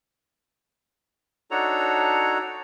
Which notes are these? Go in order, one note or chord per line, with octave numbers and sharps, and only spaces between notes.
D4 D#4 F#4 A4 C#5 A#5